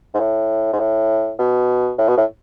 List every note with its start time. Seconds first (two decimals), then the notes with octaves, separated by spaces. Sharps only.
0.14 G#2
0.20 A2
0.73 G#2
0.80 A2
1.39 B2
1.98 A2
2.08 B2
2.18 A2